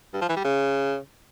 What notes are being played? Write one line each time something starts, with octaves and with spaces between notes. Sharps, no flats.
G2
F3
E3
G3
C#3